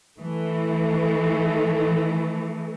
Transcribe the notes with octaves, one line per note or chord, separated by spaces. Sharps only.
E3 A3